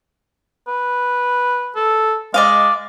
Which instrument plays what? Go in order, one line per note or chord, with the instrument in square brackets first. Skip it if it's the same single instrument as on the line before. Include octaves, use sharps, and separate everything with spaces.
[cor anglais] B4
A4
[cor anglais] G#3 [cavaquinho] D5 D#5 F5